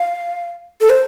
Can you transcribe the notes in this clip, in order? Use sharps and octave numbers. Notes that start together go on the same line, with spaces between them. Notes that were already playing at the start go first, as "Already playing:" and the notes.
Already playing: F5
A4
C5